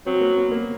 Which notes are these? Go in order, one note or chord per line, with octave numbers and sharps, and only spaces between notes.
F#3 C4
A#3
B3
A#3